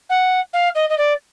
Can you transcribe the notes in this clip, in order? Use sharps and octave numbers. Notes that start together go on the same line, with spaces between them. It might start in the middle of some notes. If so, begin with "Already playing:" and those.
F#5
F5
D#5
D#5
D5